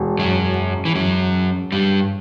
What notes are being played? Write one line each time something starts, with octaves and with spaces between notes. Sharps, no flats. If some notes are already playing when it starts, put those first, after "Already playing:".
Already playing: E1
F#2 F#3
E3
F#2 F#3
G2 G3